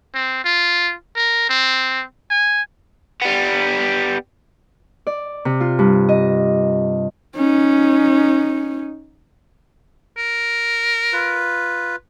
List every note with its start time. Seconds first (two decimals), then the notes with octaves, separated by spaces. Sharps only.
0.15 C4
0.44 F4
1.16 A#4
1.49 C4
2.30 G#5
3.22 G3 B3
5.07 D5
5.45 C3
5.61 F4
5.79 G2
6.09 D#5
7.36 C#4 D#4
10.17 A#4
11.13 F4 B4